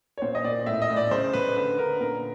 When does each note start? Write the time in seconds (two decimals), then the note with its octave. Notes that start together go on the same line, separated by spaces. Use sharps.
0.18 C#5
0.22 A#2 C5
0.35 D#5
0.44 A#2 D5
0.66 A2 E5
0.82 D#5
0.90 A2
0.96 D5
1.11 C#3 C5
1.33 C#3 B4
1.56 D3 B4
1.78 D3 A#4
2.01 A#2 A#4